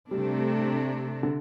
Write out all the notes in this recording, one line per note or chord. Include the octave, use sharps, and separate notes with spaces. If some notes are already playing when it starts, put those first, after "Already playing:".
C3 G3 A3 D4
D3